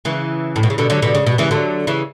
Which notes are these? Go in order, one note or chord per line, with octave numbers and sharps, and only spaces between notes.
C#3 E3
A2
B2
C#3
B2 D3
D3 F#3
B2 D3
C#3
B2
C#3 E3
D3 F#3
C#3 E3